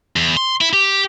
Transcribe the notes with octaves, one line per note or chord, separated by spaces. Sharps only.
E2
C6
E4
G4